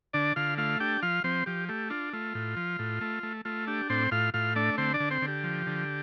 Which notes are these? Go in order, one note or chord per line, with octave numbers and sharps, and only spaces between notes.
D3 D4 D5
D3 F4 F5
A3 F4 F5
D4 G4 G5
F3 F4 F5
F3 C4 C5
F3 G4
A3 G4
D4 F4
A3 F4
A2
F3
A2
A3
A3
A3 F4
D4 G4
A2 C4 C5
A2 F4 F5
A2 F4 F5
A3 D4 D5
D3 C4 C5
D4 D5
D3
C4 C5
D3
G4
F3
D3